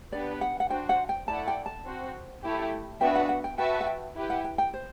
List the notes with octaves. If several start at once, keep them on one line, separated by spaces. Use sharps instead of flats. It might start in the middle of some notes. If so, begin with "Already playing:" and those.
B3 D4 G4 B4 D5
F#5
F#5
D4 F#4 C5 G5
F#5
G5
A3 E4 A4 D5 F#5 A5
G5
A5
C4 F#4 C5
A3 E4 G4
B3 D4 F#4 B4 E5 G5
F#5
F#5
G5
F#4 B4 E5 G5 A5
F#5
G5
E4 G4 B4
F#5
G5
G5
C5